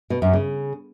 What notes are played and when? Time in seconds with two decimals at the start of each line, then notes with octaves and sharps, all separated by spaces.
0.10 B2
0.22 F#2
0.33 C#3